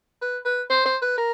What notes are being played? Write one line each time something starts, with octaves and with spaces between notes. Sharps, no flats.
B4
B4
C5
C5
B4
A#4